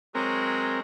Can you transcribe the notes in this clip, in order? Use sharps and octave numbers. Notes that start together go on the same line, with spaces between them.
F#3 G#3 C4 A#4